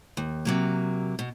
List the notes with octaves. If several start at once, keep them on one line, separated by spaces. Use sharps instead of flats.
D#2
C3 F#3 A#3
B2